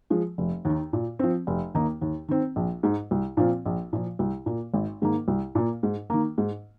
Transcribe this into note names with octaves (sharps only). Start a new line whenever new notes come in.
F3 G#3
F1
D#2 D#3
A#2
F3 C4
F1
D#2 D#3 A#3 D#4
D#2
D#3 C4
A#1
G#2 G#3 D#4
C2
A#2 F3 C4 F4
A#1
A#2 F3
C2
A#2 A#3
G#1
G#2 D#3 A#3
C2
A#2 A#3
G#2
D#3 A#3
G#2